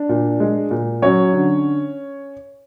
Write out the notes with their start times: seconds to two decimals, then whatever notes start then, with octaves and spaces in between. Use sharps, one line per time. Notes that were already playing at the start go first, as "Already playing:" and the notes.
Already playing: D4
0.09 A#2
0.40 G#3
0.71 A#2
1.02 F#3 C#4 C#5
1.33 D3